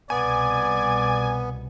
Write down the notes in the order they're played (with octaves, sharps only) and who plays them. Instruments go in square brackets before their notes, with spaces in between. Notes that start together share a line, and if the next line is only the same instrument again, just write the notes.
[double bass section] C2 B2 [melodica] B3 [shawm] D5 [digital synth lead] G#5